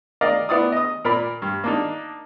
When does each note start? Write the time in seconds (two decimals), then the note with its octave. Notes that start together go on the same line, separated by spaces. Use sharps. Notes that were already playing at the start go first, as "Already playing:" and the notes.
0.21 A#4 D5 D#5 F5
0.49 B3 E4 D5 D#6
0.72 D#5 D#6
1.04 A#2 A#4 D5 B5
1.42 G2
1.64 A#3 D4 D#4